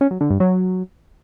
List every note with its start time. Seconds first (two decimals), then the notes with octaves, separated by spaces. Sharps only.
0.01 C#4
0.11 F#3
0.21 D3
0.30 G2
0.40 F#3